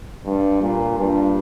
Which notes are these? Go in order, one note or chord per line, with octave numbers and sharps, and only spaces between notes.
G2
A#2
G2